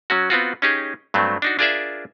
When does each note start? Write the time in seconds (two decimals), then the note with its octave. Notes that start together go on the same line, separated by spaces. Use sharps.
0.10 F#3 C#4 F#4
0.30 B3 C4 F4 F#4
0.62 C#4 D#4 G4 G#4
1.14 G2 F#3 A3 C4
1.42 D4 D#4 F#4
1.59 D4 F4 G#4 A#4 D5 E5